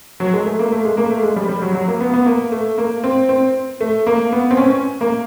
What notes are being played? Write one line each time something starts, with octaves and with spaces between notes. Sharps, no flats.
F#3
G#3
A3
A#3
A3
G#3
A#3
A3
G#3
G3
G3
F#3
F#3
A#3
B3
B3
A#3
A3
A#3
C4
C4
A3
A#3
B3
C4
C#4
A#3